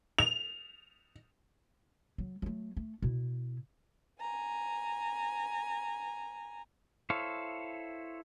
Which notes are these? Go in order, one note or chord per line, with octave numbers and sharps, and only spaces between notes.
F7
F#3
F#3 A3
A3
B2 E4
G#5 A#5
E4 A4 C5 C#5 F5